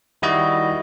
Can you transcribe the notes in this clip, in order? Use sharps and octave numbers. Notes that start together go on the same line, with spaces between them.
D#3 G3 E4 F#4 D#5